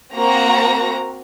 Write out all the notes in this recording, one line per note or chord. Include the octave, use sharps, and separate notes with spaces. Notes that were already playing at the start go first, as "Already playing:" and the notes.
A#3 C4 F#4 A#5 A#6